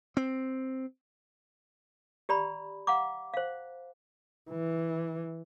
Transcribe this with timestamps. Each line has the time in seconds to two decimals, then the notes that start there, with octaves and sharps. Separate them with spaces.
0.17 C4
2.29 G4 D5 A#5 B5
2.87 F5 F#5 A#5 D6
3.34 C5 F5
4.50 E3